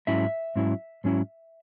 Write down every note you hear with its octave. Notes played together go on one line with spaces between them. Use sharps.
G#2 F#3 C#4 E4 E5
G#2 F#3 C#4 E4
G#2 F#3 C#4 E4